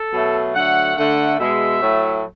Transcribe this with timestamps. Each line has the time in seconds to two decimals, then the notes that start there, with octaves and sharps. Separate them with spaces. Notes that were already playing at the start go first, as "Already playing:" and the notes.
Already playing: A4
0.12 B2 F#3 A3
0.54 D3 F#3 A3 F#5
0.96 D3 A3 F#5
1.38 B2 G#3 E5
1.81 A2 F#3 A3